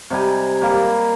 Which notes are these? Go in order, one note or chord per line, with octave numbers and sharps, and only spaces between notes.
C3 G3 D#4 G#5
G3 A#3